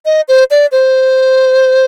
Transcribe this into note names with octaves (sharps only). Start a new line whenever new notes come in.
D#5
C5
D5
C5